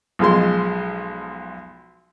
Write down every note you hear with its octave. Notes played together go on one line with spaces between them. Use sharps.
B1 F3 G#3 C6